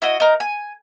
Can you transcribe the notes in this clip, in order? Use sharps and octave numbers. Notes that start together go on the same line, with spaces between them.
E4 F#4 D#5
D#4 A#4
G#5